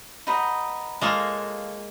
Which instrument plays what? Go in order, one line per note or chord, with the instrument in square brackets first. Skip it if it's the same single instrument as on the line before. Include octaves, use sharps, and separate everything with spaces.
[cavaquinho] D#4 F#4 B4 D#5
[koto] G#3 A#3 [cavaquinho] F4 A4 C#5